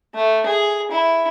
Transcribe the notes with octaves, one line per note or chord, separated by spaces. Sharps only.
A3
G#4
E4